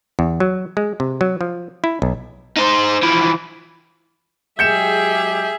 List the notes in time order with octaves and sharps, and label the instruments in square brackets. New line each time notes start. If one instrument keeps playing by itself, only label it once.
[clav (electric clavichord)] E2
F#3
G#3
C3
F#3
F3
E4
B1
[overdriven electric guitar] D#4 C5
E3 F3
[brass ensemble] F#3 G#3 G4 [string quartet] G#4 E5 [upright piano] G6 C#7 E7